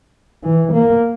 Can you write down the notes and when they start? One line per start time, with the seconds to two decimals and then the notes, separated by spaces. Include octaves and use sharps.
0.44 E3
0.73 A#3